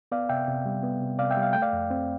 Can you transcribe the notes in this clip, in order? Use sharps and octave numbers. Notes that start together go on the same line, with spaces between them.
B3 D5 F5
C3 E5 G5
C3
G3
B3
C3
C3 D5 F5
E5 G5
G3
F5
A3 G5
D5 F5
F2
C4